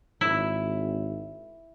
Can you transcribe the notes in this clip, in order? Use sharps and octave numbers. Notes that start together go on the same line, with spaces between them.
G#1 E4